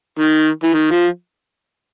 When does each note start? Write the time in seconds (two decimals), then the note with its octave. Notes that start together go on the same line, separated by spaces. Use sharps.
0.19 D#3
0.64 E3
0.74 D#3
0.91 F3